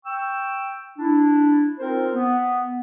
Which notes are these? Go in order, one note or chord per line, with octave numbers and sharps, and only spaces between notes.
G5 C#6 E6
D4 E4
C4 D#4 F4 A#4 C5
B3